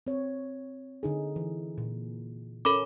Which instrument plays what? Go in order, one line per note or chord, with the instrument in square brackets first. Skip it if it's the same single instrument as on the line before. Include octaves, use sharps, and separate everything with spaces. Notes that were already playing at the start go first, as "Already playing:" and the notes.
[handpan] C4 C#5
D3 D#4 G#4
E3
A#2
[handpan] C#4 A#4 [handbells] A4 B5 D6